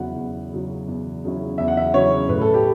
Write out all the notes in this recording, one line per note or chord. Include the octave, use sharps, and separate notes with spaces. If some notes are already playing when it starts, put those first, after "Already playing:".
Already playing: E2 C#3 F#3 C#4 E4 F#5
E2
C#3 F#3 C#4 E4
E2
C#3 F#3 C#4 E4
E2 E5
F#5
E5
C#3 F#3 C#4 E4 C#5
A2 B4
A4
G4